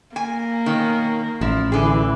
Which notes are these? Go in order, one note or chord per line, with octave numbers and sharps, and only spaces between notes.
A#3 G#5
B2 D#3 C#4
A1 F3 E4
D3 E3 G#4